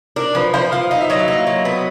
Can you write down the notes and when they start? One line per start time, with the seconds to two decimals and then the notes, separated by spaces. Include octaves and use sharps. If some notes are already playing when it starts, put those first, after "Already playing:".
0.16 D4 A#4
0.35 F3 B4
0.54 F3 C5
0.72 F3 F5
0.90 D#4 F5
1.01 E5
1.10 F#3 D#5
1.19 E5
1.28 A#3
1.47 F#3
1.65 B3